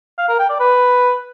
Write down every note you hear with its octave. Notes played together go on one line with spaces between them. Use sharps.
F5
A#4
G5
D5
B4